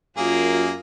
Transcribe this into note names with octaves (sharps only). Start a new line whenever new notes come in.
F#2 A#3 F4 G#4